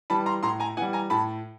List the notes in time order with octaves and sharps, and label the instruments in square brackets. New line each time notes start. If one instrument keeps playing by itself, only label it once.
[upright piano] E3 G3 A5 B5
A#5 C6
A2 A#5 C6
G#5 A#5
E3 G3 F#5 G#5
G#5 A#5
A2 A5 B5